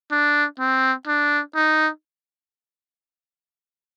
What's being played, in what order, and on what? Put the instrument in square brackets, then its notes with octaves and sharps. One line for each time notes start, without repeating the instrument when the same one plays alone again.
[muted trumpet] D4
C4
D4
D#4